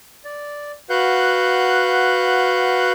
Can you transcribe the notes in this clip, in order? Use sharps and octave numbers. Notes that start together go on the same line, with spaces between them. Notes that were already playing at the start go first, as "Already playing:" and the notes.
D5
F#4 B4 F5 F#5 F#6 G6